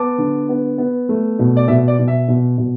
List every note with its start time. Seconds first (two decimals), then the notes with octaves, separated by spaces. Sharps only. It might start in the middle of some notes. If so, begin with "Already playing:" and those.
Already playing: B3 A5 D6
0.18 D3
0.49 B3
0.78 B3
1.09 A3
1.39 B2
1.57 D5
1.68 B2 E5
1.88 D5
1.99 B2
2.08 E5
2.28 B2
2.58 B2